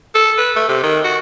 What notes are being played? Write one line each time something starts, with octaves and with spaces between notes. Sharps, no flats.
A4
B4
A3
C3
D#3
F#4